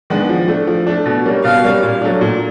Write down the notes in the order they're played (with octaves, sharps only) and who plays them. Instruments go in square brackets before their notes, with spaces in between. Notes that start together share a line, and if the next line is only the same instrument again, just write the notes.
[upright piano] D#3 G#3 B3 D4
F3
A3 D4
F3
A3 D4
B2
G3 A#3 C#4
[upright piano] B2 [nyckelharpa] F5
[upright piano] G3 A#3 C#4
A#2
F#3 A3 D4
A#2